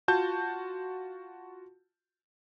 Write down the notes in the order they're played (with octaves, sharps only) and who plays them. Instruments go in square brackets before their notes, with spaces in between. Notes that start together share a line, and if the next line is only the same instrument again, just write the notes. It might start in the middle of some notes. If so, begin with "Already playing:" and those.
[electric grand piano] F4 F#4 A5 G6